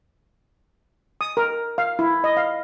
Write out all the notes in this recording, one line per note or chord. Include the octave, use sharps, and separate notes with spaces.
D#6
A#4
F5
E4
D#5
F5